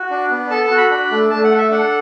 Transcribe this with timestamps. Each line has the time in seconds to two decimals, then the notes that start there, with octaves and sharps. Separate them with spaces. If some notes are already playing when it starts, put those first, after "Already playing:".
Already playing: F#4
0.10 D4
0.31 B3
0.51 A4 A5
0.64 A5
0.71 F#4
0.77 B5
0.90 D4 B5
1.11 A3
1.31 A3 A5
1.44 F#5
1.51 A4
1.58 E5
1.71 D4 F#5